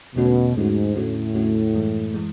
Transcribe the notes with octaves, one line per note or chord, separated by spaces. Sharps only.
E2 B2 D3 A3 C#4 F#4
E2 G#2 D3 A3 C#4 F#4
E2 A2 D3 A3 C#4 F#4
E2 D3 A3 C#4 F#4
F#2 E3 G#3
E3 G#3